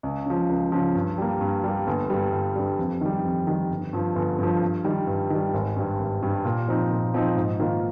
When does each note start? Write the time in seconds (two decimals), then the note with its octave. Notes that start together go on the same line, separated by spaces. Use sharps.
0.03 C#2
0.26 C#3 F3
0.49 C#2
0.72 C#3 F3
0.95 G2
1.18 G3 A#3
1.41 G2
1.64 G3 A#3
1.87 G1
2.10 G2 G3
2.32 G1
2.55 G2 G3
2.79 F2
3.01 D#3 G3
3.24 F2
3.47 D#3 G3
3.70 G1
3.93 G2 F3
4.16 G1
4.39 G2 F3
4.62 G2
4.84 D#3 G3
5.07 G2
5.30 D#3 G3
5.53 G#1
5.76 G2 G3
5.99 G#1
6.22 G2 G3
6.45 A#2
6.68 F3 C4 D#4
6.91 A#2
7.14 F3 C4 D#4
7.37 G#2
7.59 D#3 A#3 F4